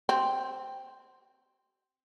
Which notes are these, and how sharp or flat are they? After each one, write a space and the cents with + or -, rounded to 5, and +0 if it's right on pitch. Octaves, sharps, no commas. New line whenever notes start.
C4 +0 F#4 +45